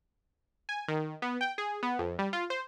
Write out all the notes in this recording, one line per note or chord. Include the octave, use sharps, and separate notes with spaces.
G#5
D#3
B3
G5
G#4
B3
F2
G3
F4
C5